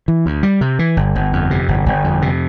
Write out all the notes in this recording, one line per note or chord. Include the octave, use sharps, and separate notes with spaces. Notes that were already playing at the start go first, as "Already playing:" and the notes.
E3
D2
G3
C3
E3
G1
G1
F2
C3
G1
G1
F2
C3